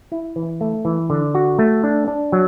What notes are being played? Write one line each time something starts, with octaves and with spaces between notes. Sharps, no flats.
E4
E3
A3
E3
D3
F#4
A3
D4
D4
F#3